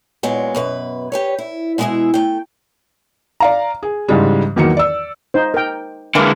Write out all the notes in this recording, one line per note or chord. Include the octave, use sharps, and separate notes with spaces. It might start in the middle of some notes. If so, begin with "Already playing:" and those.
A#2 F#3 G#3 B3
F#2 B2 B4
G4 B4 C#5
E4
B2 G#3 B3 E4 G#4 E5
A3 G5
D5 F5 A#5
G#4
G#2 C#3 E3 G3 G#3
E2 D#3 F#3 A#3 C#7
D5 E6
D#4 C5
A#4 G5
D3 E3 G#3 A#3